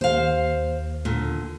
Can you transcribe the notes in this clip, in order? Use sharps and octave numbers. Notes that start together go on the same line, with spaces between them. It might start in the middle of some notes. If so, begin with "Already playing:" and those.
D#2 C5 F5
A#2 D3